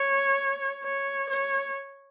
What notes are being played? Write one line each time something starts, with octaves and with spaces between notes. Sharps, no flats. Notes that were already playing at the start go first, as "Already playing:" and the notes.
Already playing: C#5
C#5
C#5